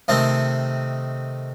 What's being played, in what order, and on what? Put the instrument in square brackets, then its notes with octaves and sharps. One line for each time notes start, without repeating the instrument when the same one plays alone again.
[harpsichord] C3 D#3 A3 C4